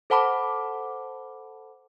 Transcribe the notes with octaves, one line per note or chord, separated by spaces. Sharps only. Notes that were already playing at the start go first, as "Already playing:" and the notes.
A4 C5 F#5 A5 B5 D6